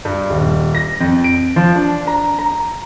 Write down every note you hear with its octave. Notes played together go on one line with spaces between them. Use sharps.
G2
D#1
A#6
F2
D7
F3
D4
A#5
A#5